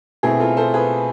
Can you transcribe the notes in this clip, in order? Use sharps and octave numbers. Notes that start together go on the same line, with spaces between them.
B2 A3 C4 E4 G#4
F4 A4
A4 C5
G#4 B4